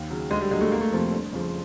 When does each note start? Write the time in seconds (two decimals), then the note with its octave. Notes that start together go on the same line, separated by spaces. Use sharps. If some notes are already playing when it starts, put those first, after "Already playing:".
Already playing: D#2
0.10 C#3 F#3
0.30 D2 G#3
0.41 G3
0.51 D3 F#3 G#3
0.61 A3
0.72 G1 A#3
0.81 A3
0.92 F2 C3 F3
1.11 G1
1.33 F2 C#3 F3